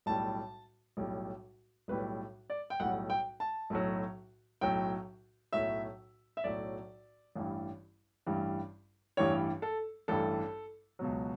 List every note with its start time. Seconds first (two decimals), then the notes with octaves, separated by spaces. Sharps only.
0.06 B1 A2 G3 A5
0.97 B1 A2 G3
1.88 B1 A2 G3 B4
2.50 D5
2.70 G5
2.80 B1 A2 G3 F#5
3.10 G5
3.40 A5
3.70 B1 A2 F#3
4.61 B1 A2 F#3 G5
5.53 B1 A2 F#3 E5
6.37 E5
6.44 B1 A2 F#3 D5
7.36 A1 G2 E3 G3
8.26 A1 G2 E3 G3
9.17 A1 G2 E3 G3 C#5
9.62 A4
10.08 A1 G2 E3 G3 A4
10.99 C#2 B2 F#3